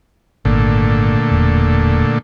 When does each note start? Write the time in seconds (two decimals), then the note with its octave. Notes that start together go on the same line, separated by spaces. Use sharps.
0.45 G#1 A#2 D3 A3
1.32 E1